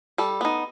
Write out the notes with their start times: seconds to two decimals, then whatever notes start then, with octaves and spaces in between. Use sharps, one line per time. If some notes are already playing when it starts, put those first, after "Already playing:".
0.18 G3 A4
0.41 B3 D#4